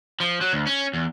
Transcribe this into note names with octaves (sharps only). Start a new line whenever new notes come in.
F3
F#3
D2
C#4
E2